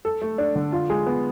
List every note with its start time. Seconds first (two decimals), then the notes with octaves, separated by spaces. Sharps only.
0.05 A4
0.22 A3
0.38 D4
0.55 D3
0.72 F4
0.90 G#3
1.06 B3